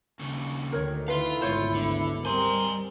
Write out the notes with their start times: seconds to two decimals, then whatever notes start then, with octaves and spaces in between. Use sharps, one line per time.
0.19 D#2 C#3
0.72 D2 D3 D#3 A#4 C#5
1.08 E4 B4 F5 C6
1.41 G#1 D2 B2 F4 C5 C#5
1.74 D3
2.25 G3 C4 A#4 C5 G#5 C6